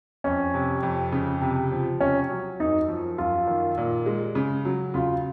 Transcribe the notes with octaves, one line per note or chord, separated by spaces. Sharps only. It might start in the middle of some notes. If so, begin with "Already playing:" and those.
F2 C#4
C3
F2
C#3
C3
F3
C3 C#4
F#3
F#2 D#4
F3
F#2 F4
D#3
A#2
G#3
C#3
F#3
C#3 F4